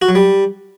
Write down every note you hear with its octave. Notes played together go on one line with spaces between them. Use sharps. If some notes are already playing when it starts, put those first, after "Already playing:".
F#4
F#3
G3